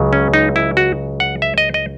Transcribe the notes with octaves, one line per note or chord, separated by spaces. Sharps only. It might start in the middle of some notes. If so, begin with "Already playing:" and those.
Already playing: C#2 C#3 F#3
C#4
D#4
E4
F#4
F#5
E5
D#5
D#5